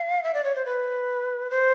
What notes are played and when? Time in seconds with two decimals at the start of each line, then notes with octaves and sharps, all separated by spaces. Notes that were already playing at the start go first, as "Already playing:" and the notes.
Already playing: F5
0.23 E5
0.34 D5
0.44 C#5
0.55 C5
0.66 B4
1.50 C5